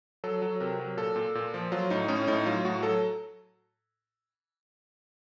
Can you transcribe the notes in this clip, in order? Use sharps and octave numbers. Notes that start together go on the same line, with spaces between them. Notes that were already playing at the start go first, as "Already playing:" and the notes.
F#3 A4
F#3
C3 A#4
F#3
A#2 A4
A#2
A#2
F3
F#3 F4
A2 D#4
A2 C#4
A2 D#4
F#3 F4
A2 F#4
F#3 A4